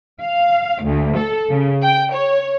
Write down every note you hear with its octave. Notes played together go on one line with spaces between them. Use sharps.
F5
D2
A4
C#3
G5
C#5